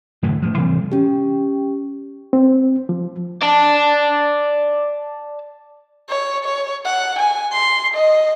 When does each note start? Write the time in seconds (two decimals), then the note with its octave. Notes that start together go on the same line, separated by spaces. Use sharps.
0.23 F#2 A2 D3 E3
0.42 A2 F3
0.57 C3 E3 G3 C4
0.92 C#4 G4
2.33 C4
2.89 F3
3.42 D5 A5
6.10 C#5
6.45 C#5
6.85 F#5
7.19 G#5
7.52 C6
7.94 D#5